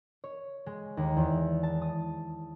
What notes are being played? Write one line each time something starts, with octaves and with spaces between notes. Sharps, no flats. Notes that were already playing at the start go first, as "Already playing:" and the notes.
C#5
G#3
D#2
E2
A5
D#6